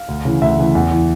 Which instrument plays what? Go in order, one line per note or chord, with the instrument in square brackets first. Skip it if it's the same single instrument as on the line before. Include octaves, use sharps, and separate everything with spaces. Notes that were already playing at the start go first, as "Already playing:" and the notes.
Already playing: [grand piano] F5
D2
C#3 E3
D2 E5
C#3 E3
E2
E3